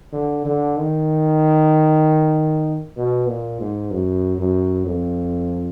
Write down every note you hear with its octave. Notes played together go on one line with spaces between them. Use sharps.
D3
D3
D#3
B2
A#2
G#2
F#2
F#2
F2